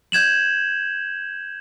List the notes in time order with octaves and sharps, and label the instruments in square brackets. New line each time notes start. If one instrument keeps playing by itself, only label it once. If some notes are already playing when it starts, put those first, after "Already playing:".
[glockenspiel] G6 G#6 E7 F#7